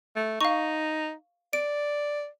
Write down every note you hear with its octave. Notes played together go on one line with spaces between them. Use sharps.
A3
D#4 F5 C#6
D5 D7